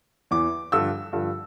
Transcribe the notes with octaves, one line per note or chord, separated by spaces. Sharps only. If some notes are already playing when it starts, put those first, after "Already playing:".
E2 E3 D6
G2 D3 F3 E6
G2 D3 F3